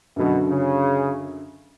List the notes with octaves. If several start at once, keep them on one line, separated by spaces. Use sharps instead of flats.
F#2 B2 D3 F#3
C#3